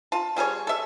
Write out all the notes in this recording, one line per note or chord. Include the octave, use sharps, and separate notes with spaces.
F4 A5
G3 G#4 A4 C#5
A4 E5